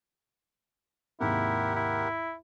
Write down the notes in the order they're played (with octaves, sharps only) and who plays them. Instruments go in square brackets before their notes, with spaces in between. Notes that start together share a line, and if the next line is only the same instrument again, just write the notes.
[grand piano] D#2 G#2 C3 [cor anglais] E4 [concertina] G4 A#4 F#5
[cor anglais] E4